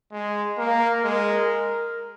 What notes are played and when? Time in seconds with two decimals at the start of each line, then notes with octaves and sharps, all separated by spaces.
0.12 G#3
0.58 A#3 A#4
1.04 G#3 A#4